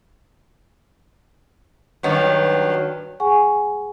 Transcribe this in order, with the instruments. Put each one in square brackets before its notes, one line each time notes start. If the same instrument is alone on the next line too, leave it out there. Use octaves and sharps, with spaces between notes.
[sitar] G2 D#3 F#3
[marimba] G#4 F#5 G#5 C#6